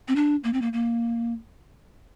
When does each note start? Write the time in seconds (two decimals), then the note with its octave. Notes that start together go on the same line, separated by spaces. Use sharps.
0.08 C4
0.16 D4
0.44 A#3
0.53 C4
0.61 A#3
0.73 A#3